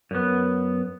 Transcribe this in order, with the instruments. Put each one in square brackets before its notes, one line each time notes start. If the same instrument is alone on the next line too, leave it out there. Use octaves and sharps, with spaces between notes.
[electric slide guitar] F#2 B3